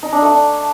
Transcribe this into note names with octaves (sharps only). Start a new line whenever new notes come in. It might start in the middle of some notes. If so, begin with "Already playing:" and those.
D#4
D4
A3
D4